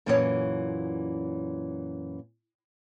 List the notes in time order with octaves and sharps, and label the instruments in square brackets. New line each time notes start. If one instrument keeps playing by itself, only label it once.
[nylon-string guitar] F#2 A#2 E3 C#4 E4 C#5